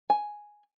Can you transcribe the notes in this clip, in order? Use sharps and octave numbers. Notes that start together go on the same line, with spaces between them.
G#5